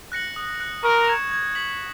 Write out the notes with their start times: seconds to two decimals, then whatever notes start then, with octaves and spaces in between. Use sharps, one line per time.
0.12 F#6 A#6 C#7 F#7
0.36 D#6
0.60 F#6 C#7
0.83 A#4 C#6
1.08 G#6 C#7 E7
1.31 G#6
1.55 B6 F#7